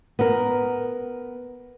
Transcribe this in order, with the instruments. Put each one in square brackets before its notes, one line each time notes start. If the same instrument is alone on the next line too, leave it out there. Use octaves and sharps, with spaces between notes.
[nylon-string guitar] B3 A#4